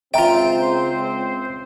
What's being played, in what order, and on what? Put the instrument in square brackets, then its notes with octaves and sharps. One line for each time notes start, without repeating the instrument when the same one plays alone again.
[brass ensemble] C#2 C4 C5 [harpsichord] F4 G5 [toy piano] E5 A#5